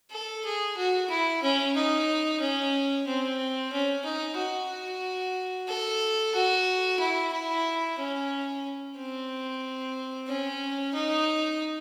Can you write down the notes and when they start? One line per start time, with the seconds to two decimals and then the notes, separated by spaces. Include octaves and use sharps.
0.11 A4
0.45 G#4
0.77 F#4
1.10 E4
1.43 C#4
1.75 D#4
2.40 C#4
3.07 C4
3.73 C#4
4.05 D#4
4.38 F#4
5.68 A4
6.34 F#4
6.99 E4
7.33 E4
7.98 C#4
8.97 C4
10.27 C#4
10.94 D#4